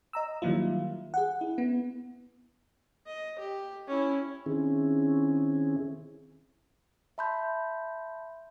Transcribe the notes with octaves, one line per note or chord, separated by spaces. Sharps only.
D#5 A#5 E6
D#3 F#3 G3 A#3 E4 F4
G#4 F#5
E4
B3
D#5
G4
C#4 E4
D#3 C4 C#4 E4 G#4
E5 A5 B5 C6 G6